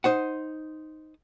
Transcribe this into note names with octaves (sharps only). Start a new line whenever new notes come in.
D#4 C5 F#5